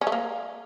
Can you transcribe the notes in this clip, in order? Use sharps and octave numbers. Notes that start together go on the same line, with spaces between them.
C#4
A3
A#3